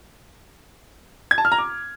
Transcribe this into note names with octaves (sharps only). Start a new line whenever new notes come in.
G#6
A5
F6
A#5
D6